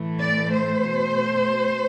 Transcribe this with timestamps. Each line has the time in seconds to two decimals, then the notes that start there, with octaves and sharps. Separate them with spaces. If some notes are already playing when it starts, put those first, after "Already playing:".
Already playing: A2 E3 A3
0.22 D5
0.53 C5
0.83 B2 A3